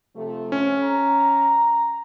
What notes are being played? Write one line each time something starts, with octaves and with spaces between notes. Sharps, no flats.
C3 F3 A3
C#4
A#5